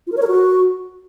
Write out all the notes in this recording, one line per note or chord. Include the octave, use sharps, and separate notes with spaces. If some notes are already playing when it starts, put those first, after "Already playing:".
F4
A#4
C#5
A#4
F#4